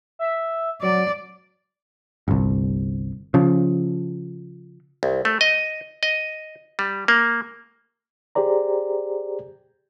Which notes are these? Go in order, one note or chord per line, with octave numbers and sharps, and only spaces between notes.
E5
F#3 D5
G1 C2
C#3 F3
C2
A3
D#5
D#5
G3
A#3
G4 G#4 C5 D5 A#5